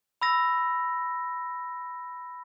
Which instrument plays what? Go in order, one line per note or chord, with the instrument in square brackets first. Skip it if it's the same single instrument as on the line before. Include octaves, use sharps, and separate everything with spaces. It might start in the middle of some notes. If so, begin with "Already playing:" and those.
[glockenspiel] B5 E6 A#6